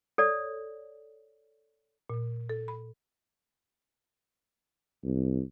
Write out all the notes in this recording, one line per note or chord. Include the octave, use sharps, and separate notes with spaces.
A4 C#5 D5
A#2
A4
B5
C2